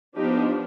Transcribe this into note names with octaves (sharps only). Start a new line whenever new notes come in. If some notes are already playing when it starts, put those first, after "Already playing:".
F3 B3 D4 D#4 G4